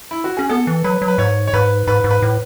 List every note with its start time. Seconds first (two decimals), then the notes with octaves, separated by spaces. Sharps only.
0.11 E4
0.24 F#4
0.37 C#4 G#4
0.49 B3 A4
0.67 E3
0.84 F#3 B4
1.02 F#3
1.08 B4
1.18 G#2 C#5
1.47 C#5
1.53 G#2 B4
1.87 G#2 B4
2.04 G#2
2.11 B4
2.22 A2